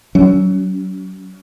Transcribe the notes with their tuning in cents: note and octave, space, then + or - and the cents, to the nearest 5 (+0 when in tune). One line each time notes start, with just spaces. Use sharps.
F#3 +25 C#4 +35